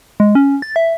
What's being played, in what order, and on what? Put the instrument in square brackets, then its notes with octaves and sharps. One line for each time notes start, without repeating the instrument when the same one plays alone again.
[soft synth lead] G#3
C#4
A6
E5